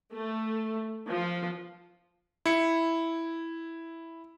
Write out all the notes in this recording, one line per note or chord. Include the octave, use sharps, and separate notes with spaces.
A3
F3
E4 C#7